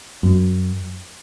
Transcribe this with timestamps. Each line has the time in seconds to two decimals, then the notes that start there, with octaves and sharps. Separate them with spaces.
0.23 F#2